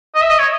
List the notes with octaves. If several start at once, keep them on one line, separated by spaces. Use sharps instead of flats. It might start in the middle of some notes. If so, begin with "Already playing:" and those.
D#5
E5
D#5
C#5